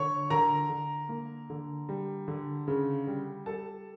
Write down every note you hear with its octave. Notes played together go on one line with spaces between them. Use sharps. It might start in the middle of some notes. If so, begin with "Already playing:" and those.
Already playing: D3 C#5 C#6
D3 A#4 A#5
D3
A#3
D3
G3
D3
C#3
G3
G3 A4 A5